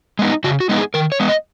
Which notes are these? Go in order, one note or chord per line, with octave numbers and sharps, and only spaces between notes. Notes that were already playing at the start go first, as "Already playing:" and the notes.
G#3 B3 D#4
C#3 F#4
F#4
G#3 B3 D#4
G#4
D#3 A#4
C#5
G#3 B3
D#5